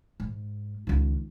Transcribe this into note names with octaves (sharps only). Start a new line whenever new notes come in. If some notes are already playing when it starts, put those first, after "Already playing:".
G#2
C#2 D#3